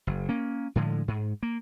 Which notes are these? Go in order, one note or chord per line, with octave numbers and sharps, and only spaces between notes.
F#1
A#3 C#4
A2 D3 F3 G#3
G#2
A#3